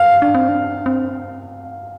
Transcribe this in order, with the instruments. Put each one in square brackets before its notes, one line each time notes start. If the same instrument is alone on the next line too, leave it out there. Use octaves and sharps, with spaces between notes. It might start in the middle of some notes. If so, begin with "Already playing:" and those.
Already playing: [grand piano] F5
[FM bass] D4
C4
D4
C4